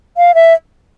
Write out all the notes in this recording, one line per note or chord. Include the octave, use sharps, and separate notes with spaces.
F5
E5